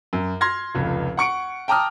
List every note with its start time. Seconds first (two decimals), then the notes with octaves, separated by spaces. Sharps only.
0.13 F#2
0.41 C6 F6 G#6 A#6
0.75 F1 C#2
1.17 F#5 C#6 C#7 D7
1.68 G5 A5 A#5 D6 D#6 F6